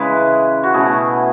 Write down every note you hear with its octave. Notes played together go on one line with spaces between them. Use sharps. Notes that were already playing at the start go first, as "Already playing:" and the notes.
Already playing: C#3 E3 G#3 G#4 B4
F#4
B2 A3 C#4 E4 G#4